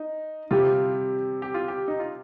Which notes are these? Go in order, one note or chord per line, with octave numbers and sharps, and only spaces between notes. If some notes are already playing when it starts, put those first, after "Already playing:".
Already playing: D#4
C3 G3 C4 F4 G4
G4
F4
G4
D#4
F4